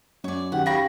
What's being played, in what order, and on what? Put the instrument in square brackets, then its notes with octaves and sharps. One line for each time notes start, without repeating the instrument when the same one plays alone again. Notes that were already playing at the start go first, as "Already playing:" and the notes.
[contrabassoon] F#2 [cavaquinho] C#5 D5
[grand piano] D#3 G4 [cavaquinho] F#5
[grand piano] G4 A#6 [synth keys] F5 [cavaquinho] G5 B5 C#6